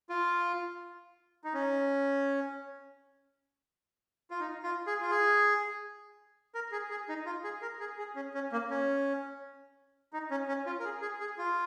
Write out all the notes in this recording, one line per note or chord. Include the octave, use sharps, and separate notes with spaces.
F4
D#4
C#4
F4
D#4
F4
G#4
F4
G#4
A#4
G#4
G#4
D#4
F4
G#4
A#4
G#4
G#4
C#4
C#4
A#3
C#4
D#4
C#4
C#4
F4
A#4
G#4
G#4
G#4
F4